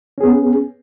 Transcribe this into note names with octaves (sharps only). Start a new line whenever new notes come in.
B3 C#4 G#4